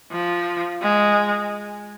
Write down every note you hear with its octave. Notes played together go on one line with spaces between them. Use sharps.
F3
G#3